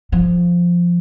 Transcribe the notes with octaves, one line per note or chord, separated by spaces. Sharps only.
F3